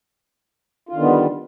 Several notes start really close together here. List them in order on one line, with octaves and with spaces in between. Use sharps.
F4 D3 D#3 B3 G3